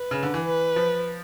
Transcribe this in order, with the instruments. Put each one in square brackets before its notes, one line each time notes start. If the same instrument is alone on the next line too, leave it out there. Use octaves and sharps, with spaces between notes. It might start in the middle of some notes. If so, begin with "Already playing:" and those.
Already playing: [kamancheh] B4
[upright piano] C#3
D3
E3
[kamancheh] B4
[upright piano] F3